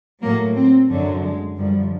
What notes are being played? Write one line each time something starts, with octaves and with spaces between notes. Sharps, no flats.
A2 F#3 A#3
C4
F#2 D3 F#3
G#3
F#2 D3 F3 G3